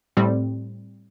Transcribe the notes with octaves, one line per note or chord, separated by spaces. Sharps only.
A2 G3 C4